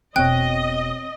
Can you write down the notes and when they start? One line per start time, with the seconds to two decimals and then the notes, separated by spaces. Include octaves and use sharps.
0.16 E1 B2 C4 C#5 D#5 G5 F#6